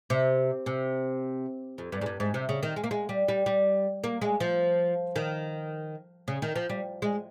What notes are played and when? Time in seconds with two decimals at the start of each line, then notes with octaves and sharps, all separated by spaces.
0.10 C3
0.66 C3
1.78 F2
1.92 G2
2.01 G#2
2.06 G2
2.20 G#2
2.34 C3
2.49 C#3
2.63 D#3
2.76 G#3
2.84 A#3
2.91 G#3
3.09 G3
3.28 G3
3.46 G3
4.04 A#3
4.21 G#3
4.40 F3
5.16 D#3
6.28 C#3
6.42 D#3
6.56 F3
6.70 G3
7.02 G#3